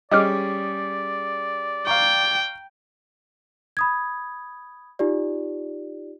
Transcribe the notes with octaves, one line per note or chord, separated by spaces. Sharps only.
G3 C#4 G#4 D5 D#5 D6 F6
F5 G5 A#5 C#6
B5 D#6 G#6
D#4 F4 G4 D5